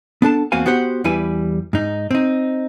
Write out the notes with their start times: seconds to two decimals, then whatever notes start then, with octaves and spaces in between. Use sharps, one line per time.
0.22 B3 D4 A4 A5
0.52 E2 A#3 C4 F#4 F5 G#5
0.66 B3 F#4 G4 C5 F#5
1.04 E2 G3 E4 B4 G#5
1.73 G#2 D#4
2.11 C4 D#4